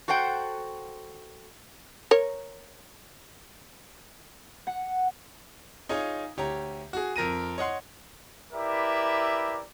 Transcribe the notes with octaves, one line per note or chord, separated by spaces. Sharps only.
F#4 A4 C5 F#5 G5
A#4 C#5
F#5
D#4 F4 G#4 C#5 G#5
D2 G4 C#5 A#5
F#4 G#4
F2 A#4 A#6 D#7
C#5 D#5 F#5 C6
E4 G4 A#4 B4 D5 E5